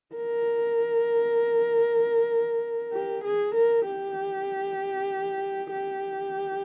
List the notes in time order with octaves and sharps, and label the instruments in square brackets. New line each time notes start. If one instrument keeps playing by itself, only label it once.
[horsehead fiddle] A#4
G4
G#4
A#4
G4
G4